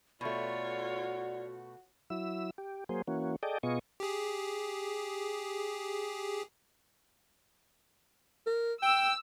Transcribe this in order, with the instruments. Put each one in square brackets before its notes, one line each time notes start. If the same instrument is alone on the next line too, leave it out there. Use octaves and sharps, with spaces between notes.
[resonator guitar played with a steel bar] B2 A3 [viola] F4 C#5 [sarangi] F#4 [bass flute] D5
[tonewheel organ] F#3 E4 E6
G4
F#3 A#3 G#4 C5
E3 A#3 C#4 F#4
G#4 A4 D5 D#5 G5
B2 B3 F4 G#4 D#5 C#6
[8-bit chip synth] G4 G#4
[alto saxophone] A#4
[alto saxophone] G5 [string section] E6